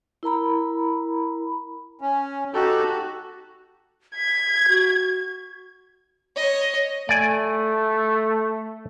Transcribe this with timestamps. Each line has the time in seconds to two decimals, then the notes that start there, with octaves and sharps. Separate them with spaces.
0.23 E4 A#4 A#5 B5
2.01 C#4
2.54 D#4 F#4 G4 A4
4.16 G#6 B6
4.69 F#4
6.36 C#5 D#5
7.09 A3 D5 G#5